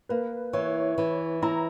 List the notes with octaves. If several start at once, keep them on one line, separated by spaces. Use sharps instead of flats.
A#3 B4
E3 C#5
E3
E4 A#5